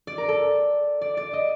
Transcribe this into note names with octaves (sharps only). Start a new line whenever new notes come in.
D5
A#4
A4
D5
D5
D#5